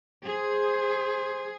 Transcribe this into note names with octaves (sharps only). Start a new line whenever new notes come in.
G#4 C5